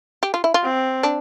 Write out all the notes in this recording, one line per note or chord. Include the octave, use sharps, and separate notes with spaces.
G4
F4
E4
F4
C4
D4